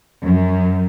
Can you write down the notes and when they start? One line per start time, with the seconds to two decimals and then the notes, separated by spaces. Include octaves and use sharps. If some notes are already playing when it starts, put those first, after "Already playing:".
0.22 F#2